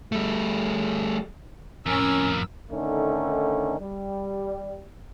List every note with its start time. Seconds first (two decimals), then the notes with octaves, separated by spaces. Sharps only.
0.12 G3 A3
1.86 F2 A2 C#4 A#4 E6
2.71 D3 D#3 A3 C#4 D#4
3.79 G3